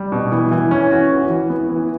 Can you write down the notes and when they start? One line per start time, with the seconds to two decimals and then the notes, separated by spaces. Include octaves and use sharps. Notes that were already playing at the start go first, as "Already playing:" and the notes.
Already playing: G3
0.12 B2
0.32 E3
0.51 E3
0.71 C#4
0.91 F#4
1.11 E3
1.30 E3
1.50 B3
1.70 E3